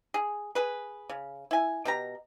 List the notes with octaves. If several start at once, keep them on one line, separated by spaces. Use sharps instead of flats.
G#4
G#4 B4
C#3
E4 G#5
B2 G4 A#5